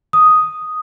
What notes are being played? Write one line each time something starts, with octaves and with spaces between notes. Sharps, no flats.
D#6